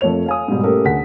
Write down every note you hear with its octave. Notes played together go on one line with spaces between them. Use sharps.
F2 A3 A#3 C#5 F7
F5 G#5 D#6
G#2 B2 G3
A3 A#3 C#4 G4 A4 A#4
D2 G#4 F#5 B6